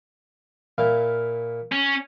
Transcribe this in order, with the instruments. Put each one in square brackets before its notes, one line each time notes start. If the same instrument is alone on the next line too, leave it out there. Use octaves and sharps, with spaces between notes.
[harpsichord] A#2 E4 F5
[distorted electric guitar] C#4